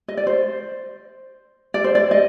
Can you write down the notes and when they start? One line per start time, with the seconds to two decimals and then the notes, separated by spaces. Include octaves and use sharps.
0.08 D#5
0.17 D5
0.27 C5
1.74 D5
1.84 C5
1.95 D5
2.11 D#5